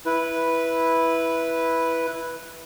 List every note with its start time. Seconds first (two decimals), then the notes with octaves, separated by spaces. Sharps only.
0.06 E4 B4